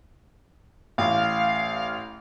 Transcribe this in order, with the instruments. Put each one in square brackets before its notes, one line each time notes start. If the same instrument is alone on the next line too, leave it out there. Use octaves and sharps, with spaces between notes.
[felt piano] A1 [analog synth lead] F5